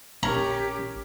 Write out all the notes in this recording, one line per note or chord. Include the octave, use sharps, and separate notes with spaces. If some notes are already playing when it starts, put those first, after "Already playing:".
A#1 C#4 G4 A#4 C#5 A#5